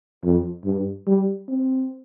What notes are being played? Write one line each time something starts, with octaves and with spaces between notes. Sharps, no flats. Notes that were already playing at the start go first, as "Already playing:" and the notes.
F2
G2
G3
C4